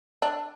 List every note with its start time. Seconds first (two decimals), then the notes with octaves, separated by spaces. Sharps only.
0.22 D4